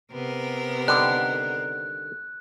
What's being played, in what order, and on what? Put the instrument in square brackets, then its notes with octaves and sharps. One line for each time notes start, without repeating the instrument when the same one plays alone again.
[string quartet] C3 B3 A#4
[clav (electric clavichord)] D3 D#3 G3 [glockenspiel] F#6